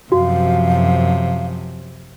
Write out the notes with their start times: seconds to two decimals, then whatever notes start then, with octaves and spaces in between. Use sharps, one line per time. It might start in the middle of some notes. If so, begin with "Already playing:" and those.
0.12 F#2 C3 F3 F#4 F5